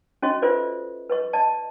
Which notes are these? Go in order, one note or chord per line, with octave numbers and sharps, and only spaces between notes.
C#4 F#4 D#5 C#6
F4 A4 B4 C5 D5 E5
B4 D#5 C#6
D5 D#5 A5